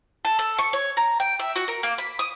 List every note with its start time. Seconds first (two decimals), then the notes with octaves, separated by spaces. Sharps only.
0.25 A4
0.39 A4
0.58 C#6
0.73 C#5
0.97 A#5
1.20 G5
1.39 E5
1.56 F#4
1.68 A#4
1.83 A#3
1.98 B5
2.19 D#6